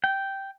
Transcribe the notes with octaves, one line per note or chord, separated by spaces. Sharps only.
G5